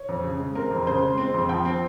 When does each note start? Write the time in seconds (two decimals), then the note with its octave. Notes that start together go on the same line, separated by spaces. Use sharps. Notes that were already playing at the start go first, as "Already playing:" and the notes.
Already playing: C#5
0.09 F2
0.24 C#3
0.40 G#3
0.55 C4 A#4
0.71 F2
0.87 C#3 C5
1.02 G#3
1.18 C4
1.34 F2
1.49 F3 G5
1.65 C4